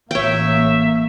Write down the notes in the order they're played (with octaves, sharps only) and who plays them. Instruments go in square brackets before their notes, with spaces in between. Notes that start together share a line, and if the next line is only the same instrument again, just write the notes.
[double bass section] A1 A#3 [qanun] C#5 G5 [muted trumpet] E5